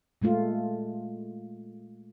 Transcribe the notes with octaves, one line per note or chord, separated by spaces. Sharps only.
A#2 G#3 A3 F4